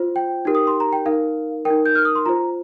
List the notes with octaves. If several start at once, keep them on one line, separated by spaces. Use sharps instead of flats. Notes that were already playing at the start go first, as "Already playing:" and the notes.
Already playing: F4 C5
G5
D#4 G4 A#4
D#6
C6
A#5
G5
D#4 A#4 F5
D#4 A#4 G5
G6
F6
D#6
C6
F4 C5 A#5